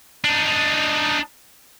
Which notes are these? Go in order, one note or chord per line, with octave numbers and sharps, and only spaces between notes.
D4 D#4